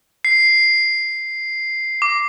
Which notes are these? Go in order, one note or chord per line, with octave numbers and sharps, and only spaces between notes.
C7
D6